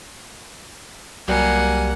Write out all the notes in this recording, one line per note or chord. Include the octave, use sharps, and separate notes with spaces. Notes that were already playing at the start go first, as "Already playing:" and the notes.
C2 F#3 G3 A#3 G4 F#5 G#5